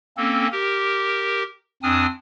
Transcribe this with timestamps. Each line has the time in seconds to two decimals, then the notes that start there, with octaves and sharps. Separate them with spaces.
0.17 A#3 C4 C#4 A4
0.52 G4 A#4
1.83 F2 C4 D4 G#5 D#6 F6